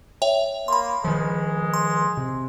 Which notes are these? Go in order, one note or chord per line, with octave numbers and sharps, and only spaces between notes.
C#5 E5 G5
A#3 B5 C6
D#3 F3 G#3
C6
C3